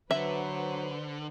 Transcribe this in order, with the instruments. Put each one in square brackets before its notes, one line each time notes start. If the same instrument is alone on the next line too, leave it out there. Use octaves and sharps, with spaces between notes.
[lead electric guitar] D3 [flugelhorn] F#3 [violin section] B4 C5 [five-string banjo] E5